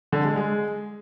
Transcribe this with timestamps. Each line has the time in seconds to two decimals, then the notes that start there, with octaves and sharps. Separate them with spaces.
0.12 D3
0.24 G#3
0.36 G#3